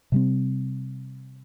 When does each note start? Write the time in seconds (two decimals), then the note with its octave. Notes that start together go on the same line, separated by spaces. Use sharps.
0.12 C3 G3 C4